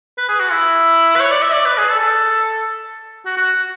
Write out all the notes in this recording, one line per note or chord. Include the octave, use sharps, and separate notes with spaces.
B4
G#4
F#4
E4
B4
C#5
D5
E5
D5
B4
G#4
A4
F#4
F#4